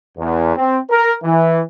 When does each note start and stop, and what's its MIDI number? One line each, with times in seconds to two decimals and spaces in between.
0.18 0.54 40
0.56 0.78 60
0.90 1.13 70
1.23 1.61 52